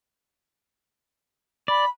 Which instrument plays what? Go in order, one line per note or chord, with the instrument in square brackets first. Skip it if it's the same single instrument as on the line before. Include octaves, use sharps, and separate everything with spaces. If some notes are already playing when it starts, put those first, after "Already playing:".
[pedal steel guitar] D5 [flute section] B5